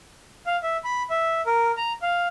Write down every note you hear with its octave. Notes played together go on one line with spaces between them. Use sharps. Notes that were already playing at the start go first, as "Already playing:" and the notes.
F5
E5
B5
E5
A#4
A#5
F5